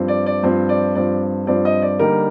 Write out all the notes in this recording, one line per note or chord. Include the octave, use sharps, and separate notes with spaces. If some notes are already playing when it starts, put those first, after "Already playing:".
Already playing: G2 F3 C4
D5
D5
G2 F3 C4 C5
D5
G2 F3 C4 D5
G2 F3 C4 D5
D#5
D5
D3 G3 A#3 D#4 A#4